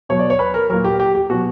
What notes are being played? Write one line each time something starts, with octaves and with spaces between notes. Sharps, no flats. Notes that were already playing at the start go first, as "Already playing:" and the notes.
B2 F#3 C#5
D5
C#5
B4
A#4
A#2 F#3 A#4
G4
G4
G4
B2 F#3 F#4